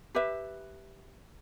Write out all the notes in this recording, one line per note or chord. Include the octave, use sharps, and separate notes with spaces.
G4 B4 E5